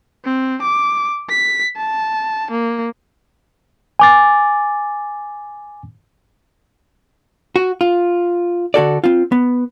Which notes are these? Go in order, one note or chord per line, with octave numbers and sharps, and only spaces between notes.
C4
D6
B6
A5
A#3
G#5 D6 A6
F#4
F4
D3 F#4 A4 D5
C4 F4
B3